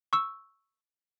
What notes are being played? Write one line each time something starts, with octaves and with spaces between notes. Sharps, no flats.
C#6 E6